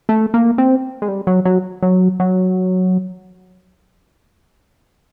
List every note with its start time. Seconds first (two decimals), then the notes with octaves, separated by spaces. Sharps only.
0.09 A3
0.34 A#3
0.58 C4
1.02 G#3
1.08 G3
1.27 F#3
1.45 F#3
1.82 F#3
2.20 F#3